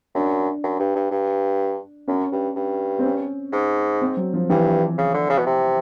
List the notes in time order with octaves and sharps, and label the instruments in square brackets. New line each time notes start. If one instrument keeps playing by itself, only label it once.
[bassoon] F#2 [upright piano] D4
[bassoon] F#2
G2
G2
G2
[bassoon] F#2 [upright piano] C#4
[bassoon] G2
G2
[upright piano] C4
C#4
[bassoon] G#2
[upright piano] C4
F#3
F3
[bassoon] G2 [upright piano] E3
[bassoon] C#3
D3
C#3
B2
C3